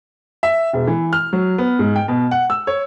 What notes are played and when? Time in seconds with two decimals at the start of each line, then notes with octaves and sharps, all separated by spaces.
0.43 E5
0.73 E1
0.87 E3
1.13 F6
1.33 F#3
1.58 B3
1.79 G#2
1.96 G5
2.08 B2
2.31 F#5
2.50 E6
2.67 C#5